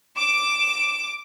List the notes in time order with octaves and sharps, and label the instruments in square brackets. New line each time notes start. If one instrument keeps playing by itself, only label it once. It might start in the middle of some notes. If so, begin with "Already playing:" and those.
[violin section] D6 [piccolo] E7